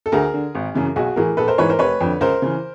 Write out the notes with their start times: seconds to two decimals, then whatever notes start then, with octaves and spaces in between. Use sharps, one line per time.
0.06 A4
0.12 D2 G#4 A#4
0.34 D3
0.55 G#1
0.74 F#2 C#3 E3
0.96 B1 F#4 G#4
1.16 A2 E3 G#4 A#4
1.37 A#1 A4 B4
1.48 A#4 C5
1.58 G#2 E3 B4 C#5
1.69 A#4 C5
1.79 F1 B4 C#5
2.01 F2 D3
2.21 C#2 A#4 C5
2.42 C#3 E3